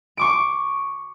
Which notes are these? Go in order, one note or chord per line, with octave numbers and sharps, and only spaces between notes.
C#6 D6 D7